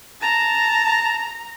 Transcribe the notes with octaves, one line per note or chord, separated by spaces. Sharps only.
A5 A#5